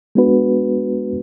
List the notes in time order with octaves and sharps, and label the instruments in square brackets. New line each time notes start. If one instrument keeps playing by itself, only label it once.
[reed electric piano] G#3 B3 D4 F#4 B4